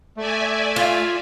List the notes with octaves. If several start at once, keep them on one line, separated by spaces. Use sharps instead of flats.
A3 D5 E5 G#5
F4